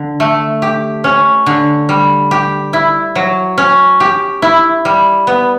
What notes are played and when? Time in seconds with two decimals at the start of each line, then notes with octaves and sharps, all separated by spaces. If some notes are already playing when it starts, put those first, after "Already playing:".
Already playing: D3
0.20 A3
0.62 G4
1.04 C#4
1.46 D3
1.89 G3
2.31 G4
2.73 E4
3.15 F#3
3.58 C#4
4.00 G4
4.42 E4
4.85 G3
5.27 B3